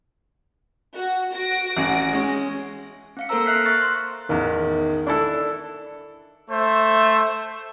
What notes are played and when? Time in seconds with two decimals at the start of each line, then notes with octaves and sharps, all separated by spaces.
0.95 F#4
1.33 F#4 A#6 D7
1.77 A1 C#4 F#5
2.13 G#3 C#4
3.17 C4 F5 C#7
3.29 A#3 A4 A#4 C5 A#5 E6
3.46 E5 F6 F#6 B6 C7
3.66 C#6 F#6 A6
3.82 C6 F#6
4.29 A1 E2 D#3
5.07 D4 E4 A4
6.50 A3 C5 E5